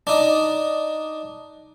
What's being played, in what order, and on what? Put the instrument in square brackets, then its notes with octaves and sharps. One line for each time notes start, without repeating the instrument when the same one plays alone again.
[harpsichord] D4 D#4